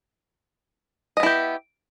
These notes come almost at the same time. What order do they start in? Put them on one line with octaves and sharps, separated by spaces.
D#5 B3 E4 G4